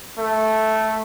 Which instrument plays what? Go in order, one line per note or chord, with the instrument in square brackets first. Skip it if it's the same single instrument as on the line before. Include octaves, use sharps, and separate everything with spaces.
[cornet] A3